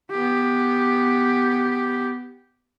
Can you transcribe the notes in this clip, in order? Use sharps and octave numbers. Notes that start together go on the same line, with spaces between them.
B3 G4